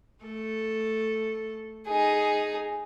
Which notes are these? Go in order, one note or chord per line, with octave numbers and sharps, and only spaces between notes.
A3 A4
D#4 G#4